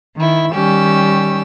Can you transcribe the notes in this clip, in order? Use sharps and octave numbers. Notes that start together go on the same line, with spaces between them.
D#3 E4
D#3 G3 C#4 G4 E6